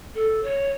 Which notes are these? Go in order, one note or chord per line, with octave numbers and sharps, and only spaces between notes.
A4
C#5